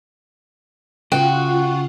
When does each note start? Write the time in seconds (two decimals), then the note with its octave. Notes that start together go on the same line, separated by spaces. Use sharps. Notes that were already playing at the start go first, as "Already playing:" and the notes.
1.12 C#3 F4 F#4 F#5 G5